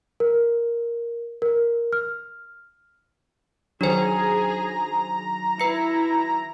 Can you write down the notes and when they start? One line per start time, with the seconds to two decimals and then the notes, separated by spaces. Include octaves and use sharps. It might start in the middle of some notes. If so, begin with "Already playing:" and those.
0.20 A#4
1.42 A#4
1.93 F6
3.81 D#3 F#3 D4 G#4 C5 A#5
5.60 E4 B4 C#7